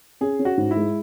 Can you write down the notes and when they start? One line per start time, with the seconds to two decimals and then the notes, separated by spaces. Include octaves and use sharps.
0.21 C#4 G#4
0.39 C#4
0.45 F#4
0.58 G#2
0.71 E4
0.77 G#3